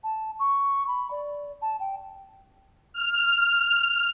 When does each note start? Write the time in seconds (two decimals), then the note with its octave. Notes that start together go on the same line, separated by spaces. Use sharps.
0.04 A5
0.39 C#6
0.88 B5
1.11 D5
1.62 A5
1.80 G5
2.93 F6